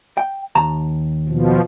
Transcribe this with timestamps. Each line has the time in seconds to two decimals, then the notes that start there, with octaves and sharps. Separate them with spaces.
0.17 G5
0.55 D#2 A5 A#5
1.29 B2 F3